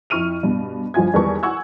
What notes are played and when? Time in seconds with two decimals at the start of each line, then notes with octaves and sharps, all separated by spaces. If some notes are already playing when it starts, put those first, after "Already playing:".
0.10 F2 E4 C#6 F6 D#7 F7
0.43 G2 B2
0.94 G1 F3 F4 G#5 G#6
1.14 E2 D#3 G3 B4 A5 C#6
1.43 F#5 G#5 C#6 E6 G#6